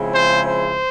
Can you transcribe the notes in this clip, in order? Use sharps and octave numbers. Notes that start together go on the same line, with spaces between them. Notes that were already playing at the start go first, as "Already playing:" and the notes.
Already playing: C#3 F3 G#3 C4 E4
C5
C5